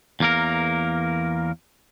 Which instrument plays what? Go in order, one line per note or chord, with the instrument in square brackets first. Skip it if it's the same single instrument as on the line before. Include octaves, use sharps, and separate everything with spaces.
[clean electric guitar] E2 A#3 A#4